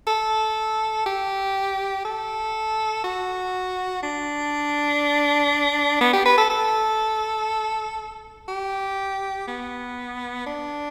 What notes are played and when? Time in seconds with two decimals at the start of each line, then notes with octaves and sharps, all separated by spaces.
0.07 A4
1.06 G4
2.05 A4
3.04 F#4
4.03 D4
6.01 B3
6.13 G4
6.25 B4
6.38 A4
6.50 A4
8.48 G4
9.48 B3
10.46 D4